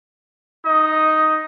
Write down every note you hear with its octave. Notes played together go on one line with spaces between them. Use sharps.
D#4 D#5